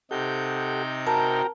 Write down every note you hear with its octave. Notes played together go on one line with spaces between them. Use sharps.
C3 D#4 G4 A4 F#5 G6
F#4 A#4 G5 A5 A#5